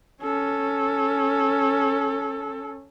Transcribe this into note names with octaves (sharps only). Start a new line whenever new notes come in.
C#4 A4